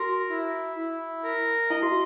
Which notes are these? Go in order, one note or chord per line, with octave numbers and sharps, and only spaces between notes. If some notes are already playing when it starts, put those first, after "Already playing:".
Already playing: F#4 A#4
E4
E4
A#4
E4 D#5
F#4